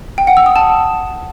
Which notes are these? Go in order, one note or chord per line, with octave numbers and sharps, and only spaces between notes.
G5
F#5
E6
D#6
A5